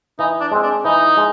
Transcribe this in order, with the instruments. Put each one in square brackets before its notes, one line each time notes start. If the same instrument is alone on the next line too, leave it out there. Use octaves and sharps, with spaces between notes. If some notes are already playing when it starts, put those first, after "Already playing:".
[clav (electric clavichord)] E3 [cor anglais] D#4
[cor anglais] D4
[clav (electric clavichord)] G#3 C4
[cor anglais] D4
[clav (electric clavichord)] E3 [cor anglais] D#4
[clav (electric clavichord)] G#3